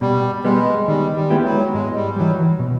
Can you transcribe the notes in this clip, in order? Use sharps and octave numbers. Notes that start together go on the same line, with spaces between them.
B2 G3
G3 G#3 B3
D#3 G3
G3
G#3 B3 E4 G4
F#3
G#2 G#3
G3
E3 F#3 G3
B2